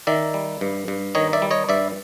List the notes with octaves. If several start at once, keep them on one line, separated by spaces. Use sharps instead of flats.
D#3 D5 E5
G3
G2
G2
D#3 C#5 D#5
D5 E5
G3
C#5 D#5
G2 D5 E5